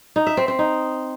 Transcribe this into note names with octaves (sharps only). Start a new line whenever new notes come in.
D#4
E5
C4
C4
D#4